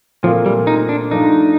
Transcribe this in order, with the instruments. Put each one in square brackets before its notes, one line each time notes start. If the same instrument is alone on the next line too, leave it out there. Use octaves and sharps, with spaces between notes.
[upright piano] A#2 A3 C4 F4 A#4 [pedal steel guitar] F3
[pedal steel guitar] G3
D#4
D4
[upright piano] G2 F3 A3 D4 [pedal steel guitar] D#4